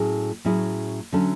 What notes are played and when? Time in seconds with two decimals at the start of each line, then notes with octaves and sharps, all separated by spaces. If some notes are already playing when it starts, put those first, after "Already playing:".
Already playing: A2 F#3 C#4 E4 G#4
0.45 A2 F#3 C#4 E4 G#4
1.12 D3 F#3 A3 C#4